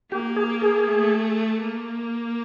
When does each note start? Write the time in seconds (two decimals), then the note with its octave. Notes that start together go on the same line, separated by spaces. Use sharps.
0.11 A#3 G4
0.36 G#4
0.62 G#4
0.87 A3
1.61 A#3